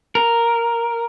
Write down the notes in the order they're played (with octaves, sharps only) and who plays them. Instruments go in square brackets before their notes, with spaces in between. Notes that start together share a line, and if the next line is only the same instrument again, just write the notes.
[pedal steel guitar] A#4